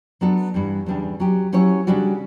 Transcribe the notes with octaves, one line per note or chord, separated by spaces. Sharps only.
F#3 B3 D4 F#4 A4
G2 E3 G3
E2 C#3 G3 D4 G4
F#3 C#4 G4
F#3 C#4 E4 G4 C#5
C#3 G3 D4 F#4